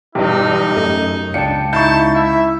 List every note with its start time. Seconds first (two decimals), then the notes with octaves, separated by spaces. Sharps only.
0.15 B1 E2 G2 D#4 G4
0.72 F#2 A3 D#5
1.34 C#2 D4 F5 G5 A5 C#7
1.73 D#4 E4 F5 A5 C#6 G6
2.15 E4 E5